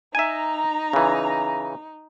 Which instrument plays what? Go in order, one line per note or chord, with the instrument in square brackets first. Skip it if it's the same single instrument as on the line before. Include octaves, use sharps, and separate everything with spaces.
[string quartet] D#4 [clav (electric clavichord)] E5 G#5 [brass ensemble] A#5
[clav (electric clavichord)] C#3 E3